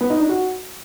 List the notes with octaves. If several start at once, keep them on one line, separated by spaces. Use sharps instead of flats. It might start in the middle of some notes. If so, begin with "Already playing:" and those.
B3
D#4
D4
F#4